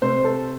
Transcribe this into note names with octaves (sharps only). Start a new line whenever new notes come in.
C3 A3 C4 C5
A4